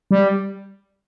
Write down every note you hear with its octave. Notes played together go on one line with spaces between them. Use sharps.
G3